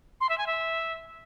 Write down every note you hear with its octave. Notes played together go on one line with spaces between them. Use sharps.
C6
E5
G#5
E5